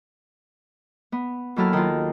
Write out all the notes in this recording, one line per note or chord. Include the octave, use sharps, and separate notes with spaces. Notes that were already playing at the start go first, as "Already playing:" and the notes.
B3
D#2 F#3 E4 A4 F6
D#3 F4